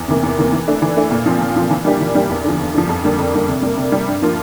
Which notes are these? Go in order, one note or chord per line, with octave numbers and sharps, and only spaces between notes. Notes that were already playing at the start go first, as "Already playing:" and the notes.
Already playing: E2
C3 E3 A#3
E2
C3 E3 A#3
E3
A3 D4
E3
A3 D4
A#2
F3 C4 F4
A#2
F3 C4 F4
E3
G3 A#3 D4 G4
E3
G3 A#3 D4 G4
E2
D3 F3
E2
D3 F3
F2
D3 G3 A#3
F2
D3 G3 A#3
C3
G3 A#3
C3
G3 A#3
G2
F3 A#3 F4